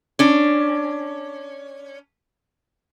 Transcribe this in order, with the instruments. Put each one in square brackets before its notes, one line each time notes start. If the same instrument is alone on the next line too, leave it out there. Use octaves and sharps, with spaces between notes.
[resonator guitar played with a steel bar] C#4 D4